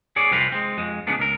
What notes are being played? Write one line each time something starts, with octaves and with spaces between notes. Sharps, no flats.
G#4 C#5 D5
C2 F2 C4 F4 B4 F5
G#3 C4
F2 G#3
C#3 E3 G#3 A3 B3 D4
C#2 A#4